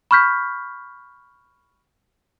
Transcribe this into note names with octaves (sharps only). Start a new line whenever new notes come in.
B5 C#6 F6 G6 B6